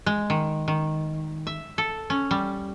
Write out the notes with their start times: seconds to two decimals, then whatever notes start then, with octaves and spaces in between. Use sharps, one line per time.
0.06 G#3
0.30 D#3
0.68 D#3
1.47 E5
1.78 A4
2.10 C#4
2.31 G3